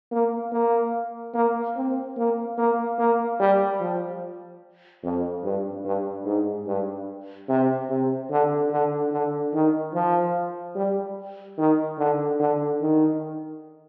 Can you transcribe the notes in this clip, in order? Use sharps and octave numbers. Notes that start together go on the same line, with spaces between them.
A#3
A#3
A#3
C4
A#3
A#3
A#3
G3
F3
F2
G2
G2
G#2
G2
C3
C3
D3
D3
D3
D#3
F3
G3
D#3
D3
D3
D#3